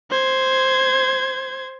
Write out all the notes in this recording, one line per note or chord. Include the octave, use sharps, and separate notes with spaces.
C5 G#6